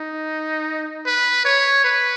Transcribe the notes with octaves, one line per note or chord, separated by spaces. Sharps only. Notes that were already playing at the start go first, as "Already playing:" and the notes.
Already playing: D#4
B4
C#5
B4